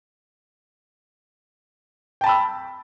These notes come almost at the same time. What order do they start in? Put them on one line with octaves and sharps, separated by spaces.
G5 A5 B5 E6